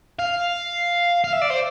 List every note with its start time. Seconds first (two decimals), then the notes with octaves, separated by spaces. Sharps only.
0.19 F5
1.24 F5
1.33 E5
1.42 D5
1.50 C5